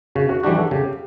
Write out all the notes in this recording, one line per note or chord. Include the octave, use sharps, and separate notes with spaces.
C#3 F#4
F#4
E3 G3 D4 F#4 G4
A4
C#3 G4